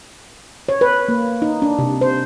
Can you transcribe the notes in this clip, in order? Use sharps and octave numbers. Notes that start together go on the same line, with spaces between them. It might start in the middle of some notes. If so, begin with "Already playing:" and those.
C#5
B4
A#3
D#4
D4
C3
C5